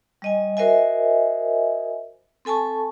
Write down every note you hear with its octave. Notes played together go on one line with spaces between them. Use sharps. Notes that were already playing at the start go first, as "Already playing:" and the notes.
G3 D#5 G#5
F#4 A#4 C5 D#5 E5 G#5
C4 A4 G#5 A5 C#6